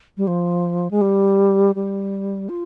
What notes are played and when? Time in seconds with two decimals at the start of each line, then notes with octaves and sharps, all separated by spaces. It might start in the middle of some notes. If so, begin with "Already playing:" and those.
0.17 G3
0.27 F3
0.91 G#3
1.01 G3
1.75 G3
2.49 F4